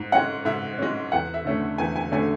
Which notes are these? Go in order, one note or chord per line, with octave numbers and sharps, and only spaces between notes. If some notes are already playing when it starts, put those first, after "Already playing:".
Already playing: G#2
G#3 C#4 F#5
G#2 E5
G#3 C#4
E2 F#5
E5
D3 A3 C#4
E2 G#5
G#5
D3 A3 C#4 G#5